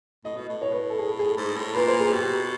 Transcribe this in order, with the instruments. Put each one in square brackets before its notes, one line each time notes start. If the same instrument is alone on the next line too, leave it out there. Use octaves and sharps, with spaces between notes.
[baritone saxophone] A2 [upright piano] D#5
[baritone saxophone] B2
A2
[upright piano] C#5
B4
A4
G#4
G#4
[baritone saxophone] G#2
A2
[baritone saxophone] A#2 [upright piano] B4
[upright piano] C5
G#4
[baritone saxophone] B2 [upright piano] G4